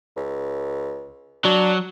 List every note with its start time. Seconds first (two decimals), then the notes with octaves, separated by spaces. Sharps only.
0.17 C#2
1.45 F#3 D4